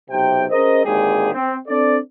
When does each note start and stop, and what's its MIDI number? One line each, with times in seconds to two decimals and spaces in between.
0.10 0.45 35
0.10 0.45 48
0.10 0.45 79
0.51 0.85 61
0.51 0.85 68
0.51 0.85 70
0.51 0.85 72
0.51 0.85 75
0.85 1.33 32
0.85 1.33 39
0.85 1.33 50
0.85 1.33 56
0.85 1.33 67
0.85 1.33 68
1.33 1.56 60
1.68 1.98 60
1.68 1.98 62
1.68 1.98 69
1.68 1.98 74